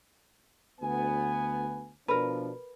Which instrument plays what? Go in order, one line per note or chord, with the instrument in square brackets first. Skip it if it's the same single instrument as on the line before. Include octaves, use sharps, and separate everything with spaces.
[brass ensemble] D2 B3 G#5
[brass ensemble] B2 F3 D4 [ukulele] A#4 B4